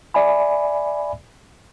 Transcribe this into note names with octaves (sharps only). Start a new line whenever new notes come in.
D5 E5 G#5 B5